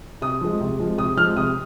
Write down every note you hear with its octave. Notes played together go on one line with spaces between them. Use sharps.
C3 D#6
F3 G#3
C3
F3 G#3
C3 D#6
F3 G#3 F6
C3 D#6